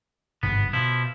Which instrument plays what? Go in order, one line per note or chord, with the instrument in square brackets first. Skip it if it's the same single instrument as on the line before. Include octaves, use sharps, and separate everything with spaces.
[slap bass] G1 G#2 C3 [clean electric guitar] B3
[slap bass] B2 [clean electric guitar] F3 E4